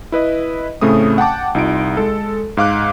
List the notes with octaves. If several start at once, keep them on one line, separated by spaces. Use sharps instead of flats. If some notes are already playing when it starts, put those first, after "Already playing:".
E4 B4 D#5
A2 C#3 A3 C4 D#6
F#5 G5 A5 D6
C2 D#4 F4 D7
G#3 A4
G#2 F5 D6 F#6